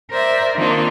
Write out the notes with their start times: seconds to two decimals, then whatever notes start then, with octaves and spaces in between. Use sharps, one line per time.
0.11 A#4 C5 D5 E5
0.57 D#3 A#3 C4 D4 F4